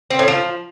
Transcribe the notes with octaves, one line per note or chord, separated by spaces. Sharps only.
C4
A2
F3